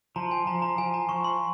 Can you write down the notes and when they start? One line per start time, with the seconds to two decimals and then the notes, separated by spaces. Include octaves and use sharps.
0.16 F3 A#5
0.31 G#5
0.47 F3 A#5
0.62 A#5
0.78 F3 G#5
0.94 A#5
1.09 F3 C#6
1.24 C6